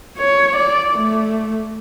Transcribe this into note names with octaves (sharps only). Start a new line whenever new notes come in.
C#5
D5
A3